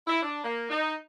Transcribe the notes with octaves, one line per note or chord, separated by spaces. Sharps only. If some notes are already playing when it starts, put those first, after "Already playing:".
E4
D4
A#3
D#4